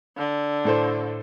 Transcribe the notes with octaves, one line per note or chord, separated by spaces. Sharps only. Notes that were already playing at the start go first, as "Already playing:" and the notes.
D3
A2 A4 C5